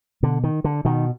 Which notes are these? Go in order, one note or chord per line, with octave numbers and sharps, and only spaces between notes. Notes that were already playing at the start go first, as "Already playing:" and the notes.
B2 D3
D#3
D3
B2 D#3